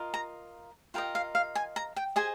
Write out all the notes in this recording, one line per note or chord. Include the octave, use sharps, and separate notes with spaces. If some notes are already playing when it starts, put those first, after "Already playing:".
Already playing: F4 A#4 D#5
A#5
F4 A#4 D#5 G5
F5
F5
G#5
A#5
G5
G#4 C5 D#5 G#5